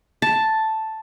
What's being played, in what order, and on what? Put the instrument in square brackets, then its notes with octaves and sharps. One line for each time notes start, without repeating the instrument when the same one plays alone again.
[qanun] A5